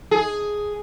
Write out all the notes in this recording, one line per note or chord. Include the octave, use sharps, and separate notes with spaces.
G#4